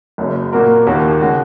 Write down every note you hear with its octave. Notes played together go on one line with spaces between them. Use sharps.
F#1 F#2 C#3
A#2 A#3 F#4 A#4
D#2 D#3 A#3 F#4
C#3 G#3 F#4